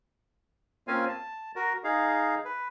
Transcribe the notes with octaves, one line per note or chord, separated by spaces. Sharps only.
A#3 C4 C#4 F4 F5 G#5
A5
F#4 A#4
D#4 G#4 F5
B4